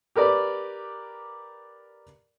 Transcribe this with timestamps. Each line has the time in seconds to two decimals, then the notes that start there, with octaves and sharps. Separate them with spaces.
0.16 G4 A#4 B4 D5